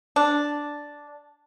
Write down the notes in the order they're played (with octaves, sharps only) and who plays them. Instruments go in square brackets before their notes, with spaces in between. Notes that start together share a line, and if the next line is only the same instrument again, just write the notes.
[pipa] D4